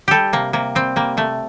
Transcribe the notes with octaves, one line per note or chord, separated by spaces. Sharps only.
G3 G4 A4
C3 A#3
C3 A#3
G3 C4
G3 A#3
C3 A3